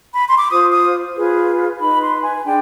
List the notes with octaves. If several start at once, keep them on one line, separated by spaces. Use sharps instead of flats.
B5
C6
D6
F4 C5 D#6
D#6
F4 G#4 B4
D#4 B4 B5
C6
G#5
D4 G#4 G5